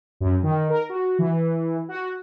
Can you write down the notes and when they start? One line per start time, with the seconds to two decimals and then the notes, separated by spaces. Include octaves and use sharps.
0.20 F#2
0.43 D#3
0.70 A#4
0.89 F#4
1.19 E3
1.89 F#4